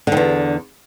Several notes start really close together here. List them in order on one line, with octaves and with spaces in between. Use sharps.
D3 G2 E2